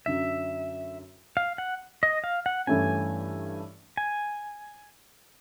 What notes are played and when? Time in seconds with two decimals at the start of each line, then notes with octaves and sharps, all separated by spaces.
0.06 F#2 D3 F#3 E5
1.37 F5
1.58 F#5
2.03 D#5
2.24 F5
2.46 F#5
2.67 G2 E3 A3 C#4 G#5
3.97 G#5